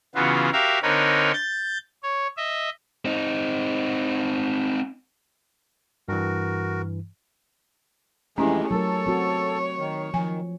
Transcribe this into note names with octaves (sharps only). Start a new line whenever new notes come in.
C#3 E3 B3 F4 F#4
F#4 G4 A#4 E5 F5
D3 C4 D#4 A#4 B4 C#5
G6 A6
C#5
D#5 E5
C4 D#4
G2 E3 F#4 A#4
F2 E3 G#3 A3 C#4 E4 G4
F#3 A3 A4 A#4 C#5
C4 F#4
D#3
D#3 F3 G#5